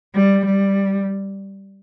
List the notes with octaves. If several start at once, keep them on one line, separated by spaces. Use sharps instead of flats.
G3
G3